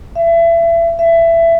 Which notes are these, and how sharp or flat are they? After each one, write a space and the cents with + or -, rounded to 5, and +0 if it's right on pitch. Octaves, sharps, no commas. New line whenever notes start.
E5 +30
E5 +20